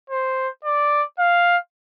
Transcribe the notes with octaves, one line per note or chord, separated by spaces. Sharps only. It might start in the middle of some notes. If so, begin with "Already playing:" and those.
C5
D5
F5